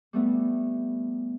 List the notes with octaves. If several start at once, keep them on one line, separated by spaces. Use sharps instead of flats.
G3 A3 B3